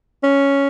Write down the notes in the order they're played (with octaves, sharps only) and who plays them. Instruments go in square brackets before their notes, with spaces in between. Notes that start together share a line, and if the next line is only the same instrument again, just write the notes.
[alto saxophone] C#4